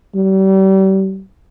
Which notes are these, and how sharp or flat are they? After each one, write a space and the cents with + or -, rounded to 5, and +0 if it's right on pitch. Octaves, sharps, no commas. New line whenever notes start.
G3 -35